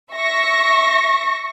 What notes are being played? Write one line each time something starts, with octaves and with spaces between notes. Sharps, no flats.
E5 C#6 A#6